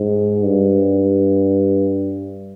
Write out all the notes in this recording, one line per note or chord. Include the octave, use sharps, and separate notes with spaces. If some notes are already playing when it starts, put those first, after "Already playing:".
Already playing: G#2
G2